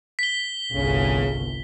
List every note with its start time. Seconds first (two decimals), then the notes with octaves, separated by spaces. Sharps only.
0.19 B6 G7
0.73 G1 C2 C#3 C#4